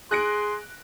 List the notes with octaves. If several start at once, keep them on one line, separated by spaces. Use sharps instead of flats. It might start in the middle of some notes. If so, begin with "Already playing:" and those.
G#4 C6 F#6 A#6 D7